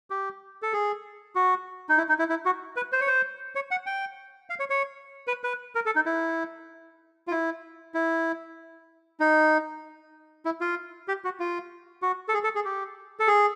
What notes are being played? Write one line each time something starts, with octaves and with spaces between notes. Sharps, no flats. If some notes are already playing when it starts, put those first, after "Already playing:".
G4
A4
G#4
F#4
D#4
E4
D#4
E4
E4
F#4
B4
C5
C#5
C5
C#5
F#5
G5
F5
C#5
C#5
B4
B4
A#4
A4
D#4
E4
F4
E4
E4
D#4
E4
F4
G4
F#4
F4
F#4
A4
G#4
A4
G#4
G4
A4
G#4